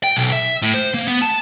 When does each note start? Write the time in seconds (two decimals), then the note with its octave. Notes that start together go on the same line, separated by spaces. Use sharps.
0.04 G5
0.17 B1
0.32 E5
0.62 A2
0.74 C5
0.94 A#3
1.08 B3
1.22 A5